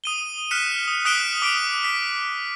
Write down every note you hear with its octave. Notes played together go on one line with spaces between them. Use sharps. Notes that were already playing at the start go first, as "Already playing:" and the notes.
D#6 D#7 G7
F6 F#6 B6 C#7 E7
D#6
D#6 F#6 B6 D7 E7 G7
D6 D#6 B6 D7
B6